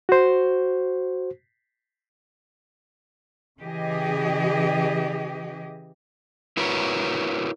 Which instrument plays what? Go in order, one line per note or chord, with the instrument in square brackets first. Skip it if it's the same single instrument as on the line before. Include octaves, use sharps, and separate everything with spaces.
[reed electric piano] F#4 C5
[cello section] C#3 E3 G4 G#4 D#5
[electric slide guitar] E4 F#4 A#4 B4 C#5